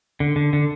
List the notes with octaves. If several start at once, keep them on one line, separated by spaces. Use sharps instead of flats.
D3
D3
D3